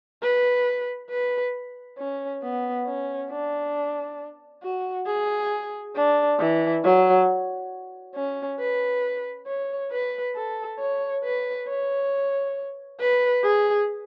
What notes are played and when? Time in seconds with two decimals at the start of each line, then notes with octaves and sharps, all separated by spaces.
0.23 B4
1.10 B4
1.98 C#4
2.43 B3
2.87 C#4
3.30 D4
4.63 F#4
5.07 G#4
5.96 D4
6.39 E3
6.84 F#3
8.16 C#4
8.60 B4
9.47 C#5
9.91 B4
10.36 A4
10.80 C#5
11.24 B4
11.69 C#5
13.00 B4
13.44 G#4